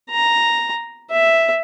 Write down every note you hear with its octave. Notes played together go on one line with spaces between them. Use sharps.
A#5
E5